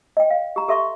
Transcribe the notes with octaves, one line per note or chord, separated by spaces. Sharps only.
D#5 G5
F5
G4 A#5
G4 A4 E5 C6 C#6